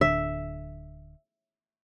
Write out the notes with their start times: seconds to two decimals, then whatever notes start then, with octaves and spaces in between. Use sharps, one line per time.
0.01 D1 D3 E5